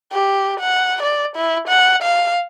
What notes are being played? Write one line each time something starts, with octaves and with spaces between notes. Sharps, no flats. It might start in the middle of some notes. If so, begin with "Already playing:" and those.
G4
F#5
D5
E4
F#5
F5